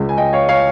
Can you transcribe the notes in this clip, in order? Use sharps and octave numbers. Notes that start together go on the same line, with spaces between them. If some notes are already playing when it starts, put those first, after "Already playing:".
Already playing: C#2 C#3 G#3
G#5
D#5 G5
C#5 F5
C#5 F5